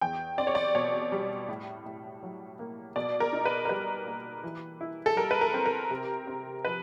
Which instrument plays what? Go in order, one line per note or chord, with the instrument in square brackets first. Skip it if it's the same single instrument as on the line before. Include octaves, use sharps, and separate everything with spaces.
[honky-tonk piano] E2 G5
C4 D5
C#5
D5
B2 C#5
G3
A2
A2
F#3
A#3
B2 D5
A#4
D#4
B4
A#4
G3 B4
A#3
E3
E4
A4
G3 A#4
B4
A#4
C4
A#4
C3
C4
F3 B4